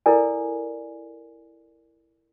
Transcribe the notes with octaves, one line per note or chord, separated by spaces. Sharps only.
E4 A4 A#4 D5 G#5